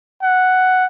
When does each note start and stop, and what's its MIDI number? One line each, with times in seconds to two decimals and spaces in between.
0.23 0.86 78